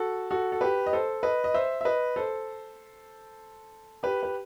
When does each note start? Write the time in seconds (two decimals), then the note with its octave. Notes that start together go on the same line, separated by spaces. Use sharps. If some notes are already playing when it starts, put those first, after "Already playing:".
Already playing: F#4 A4
0.30 F#4 A4
0.52 A4
0.61 G4 B4
0.86 D#5
0.93 A4 C5
1.23 B4 D#5
1.44 D#5
1.54 C5 E5
1.81 E5
1.85 B4 D#5
2.16 A4 C5
4.03 G4 B4
4.23 B4